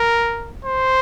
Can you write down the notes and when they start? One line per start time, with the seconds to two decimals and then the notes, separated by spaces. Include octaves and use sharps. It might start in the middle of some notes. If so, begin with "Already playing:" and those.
Already playing: A#4
0.65 C5